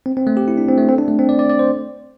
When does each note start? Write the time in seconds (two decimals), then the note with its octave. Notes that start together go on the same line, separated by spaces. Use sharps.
0.06 C4
0.17 C4
0.27 A3
0.37 G4
0.48 E4
0.58 D4
0.68 C4
0.78 A3
0.89 C4
0.98 D4
1.08 A3
1.19 C4
1.29 D5
1.39 D5
1.49 D5
1.59 C5